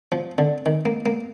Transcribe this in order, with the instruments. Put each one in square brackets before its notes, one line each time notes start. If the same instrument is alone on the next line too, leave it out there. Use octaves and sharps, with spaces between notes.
[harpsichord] F3
D3
D#3
A#3
A#3